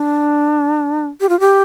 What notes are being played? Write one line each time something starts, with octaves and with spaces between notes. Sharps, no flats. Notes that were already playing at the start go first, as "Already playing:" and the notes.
Already playing: D4
G4
F4
G4